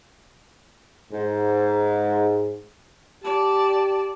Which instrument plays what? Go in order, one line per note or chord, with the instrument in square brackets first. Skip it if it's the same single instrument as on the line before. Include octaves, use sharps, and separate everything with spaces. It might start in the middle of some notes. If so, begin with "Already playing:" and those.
[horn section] G#2
[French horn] G4 [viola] D5 A5